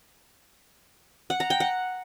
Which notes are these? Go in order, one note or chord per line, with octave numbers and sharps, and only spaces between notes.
F#5
A#5
G5
F#5